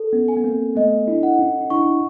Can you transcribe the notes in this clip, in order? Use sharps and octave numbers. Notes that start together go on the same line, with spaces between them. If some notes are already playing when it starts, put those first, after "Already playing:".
Already playing: A4
B3 C#4
G#5
B3
A#3 C4
A3 B3 D#5
D4 E4
F#5
C#4 D#4
D#4
D4 E4 C#6